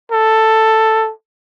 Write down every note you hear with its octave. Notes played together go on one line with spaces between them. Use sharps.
A4